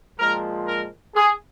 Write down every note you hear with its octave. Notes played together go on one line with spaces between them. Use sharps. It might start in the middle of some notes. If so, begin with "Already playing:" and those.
A#2 F3 G#3 A#4
A#4
G#4